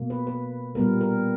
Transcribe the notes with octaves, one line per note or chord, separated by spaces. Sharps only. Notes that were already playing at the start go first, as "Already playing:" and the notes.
Already playing: B2 A#3
B4
B4
A#2 G3 B3 A#4
A#4